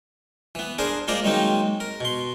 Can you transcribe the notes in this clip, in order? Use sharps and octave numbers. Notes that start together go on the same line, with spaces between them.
E3 B3
D4 G#4 A#4 C5
G#3 A#3 F4 C5 D5 A#5
D#3 F#3 G#3 A#3 C4 D#4
A#4
B2 C6